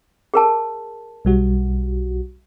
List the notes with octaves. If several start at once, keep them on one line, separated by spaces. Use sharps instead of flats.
G#4 A#4 A5
B1 G3 F#4